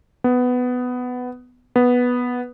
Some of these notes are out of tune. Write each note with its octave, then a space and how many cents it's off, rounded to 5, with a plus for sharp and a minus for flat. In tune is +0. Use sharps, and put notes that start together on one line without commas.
B3 +10
B3 -5